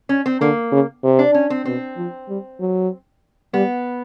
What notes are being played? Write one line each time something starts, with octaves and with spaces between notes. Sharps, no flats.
C#4
C4
D3 A#3
C#3
C3
D4
C#4
C4
B2 C4
F3
G3
F#3
G3 B3